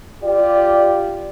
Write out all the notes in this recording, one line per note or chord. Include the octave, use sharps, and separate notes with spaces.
F4 G4 D5